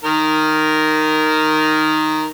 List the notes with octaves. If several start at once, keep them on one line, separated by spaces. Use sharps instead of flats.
D#3 A#4